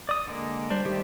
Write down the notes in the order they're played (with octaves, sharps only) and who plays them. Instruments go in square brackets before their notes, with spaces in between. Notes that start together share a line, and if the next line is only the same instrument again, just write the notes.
[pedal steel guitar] D5 D#6
D3 G#3 A#3
[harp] G3 C5 [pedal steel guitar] D4
[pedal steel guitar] D#3 A3 [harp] G4